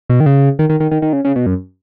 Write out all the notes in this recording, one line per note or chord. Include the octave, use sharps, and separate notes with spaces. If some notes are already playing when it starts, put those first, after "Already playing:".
B2
D#3
C#3
D#3
D#3
D#3
D#3
D#3
C#3
C#3
B2
F#2